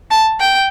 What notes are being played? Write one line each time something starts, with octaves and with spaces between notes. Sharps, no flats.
A5
G5